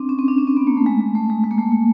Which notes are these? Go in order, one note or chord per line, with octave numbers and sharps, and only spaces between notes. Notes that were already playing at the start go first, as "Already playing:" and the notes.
Already playing: C4 D4
C#4
C4
D4
C#4
C4
B3
A#3
A3
G#3
G#3
A3
G#3
G#3
A#3
A3
A#3